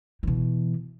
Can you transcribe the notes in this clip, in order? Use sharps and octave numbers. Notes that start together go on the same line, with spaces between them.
B2 E3